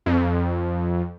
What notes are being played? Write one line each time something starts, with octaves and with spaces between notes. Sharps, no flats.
F2